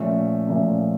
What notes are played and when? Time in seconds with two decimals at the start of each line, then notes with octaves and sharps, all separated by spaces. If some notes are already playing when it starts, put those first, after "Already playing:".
Already playing: A#2 F3 A3 C#4
0.47 A#2 F3 A3 C#4